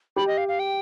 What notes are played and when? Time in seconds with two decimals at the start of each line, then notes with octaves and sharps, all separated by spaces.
0.16 G4 B5
0.27 D#5
0.37 F5
0.48 F5
0.59 G5